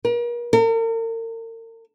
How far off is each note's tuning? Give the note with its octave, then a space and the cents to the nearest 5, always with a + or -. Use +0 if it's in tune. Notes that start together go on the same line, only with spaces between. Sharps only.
A#4 +40
A#4 -40